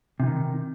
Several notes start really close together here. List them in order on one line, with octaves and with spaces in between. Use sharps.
C3 E3 D#3